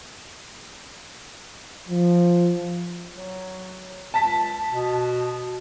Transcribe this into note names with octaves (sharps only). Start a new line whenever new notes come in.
F3
F#3
C#2 A5 B6
B2